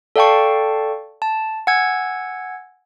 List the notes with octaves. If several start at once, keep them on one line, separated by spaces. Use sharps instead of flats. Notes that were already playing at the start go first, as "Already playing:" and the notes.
A4 D5 F5 G5 A5 C#6
A5
F#5 G#5 E6 G#6